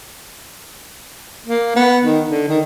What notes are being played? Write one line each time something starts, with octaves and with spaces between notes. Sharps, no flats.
A#3
B3
D#3
D3
D#3